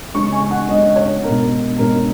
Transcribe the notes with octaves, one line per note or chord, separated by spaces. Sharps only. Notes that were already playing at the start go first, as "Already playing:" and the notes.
C#3 G#3 C#4 C#6
G#5
F#5
C#3 G#3 C#4 D#5
C#5
B2 G#3 C#4 A#4
B2 G#3 C#4 A#4